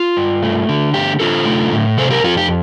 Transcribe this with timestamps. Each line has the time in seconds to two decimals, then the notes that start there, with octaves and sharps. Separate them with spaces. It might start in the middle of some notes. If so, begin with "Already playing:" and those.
Already playing: F4
0.17 G2
0.43 A3
0.69 D3
0.94 A3 G4
1.20 D3 F4 A4
1.46 A3
1.72 A2
1.98 C3 A4 C5
2.11 G4 A#4
2.24 F2 F4 A4
2.37 G4